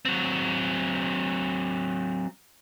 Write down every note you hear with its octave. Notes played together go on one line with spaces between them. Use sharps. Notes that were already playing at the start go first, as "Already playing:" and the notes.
F#3 C4